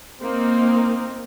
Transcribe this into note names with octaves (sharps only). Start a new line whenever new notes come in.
A#3 C4 D#4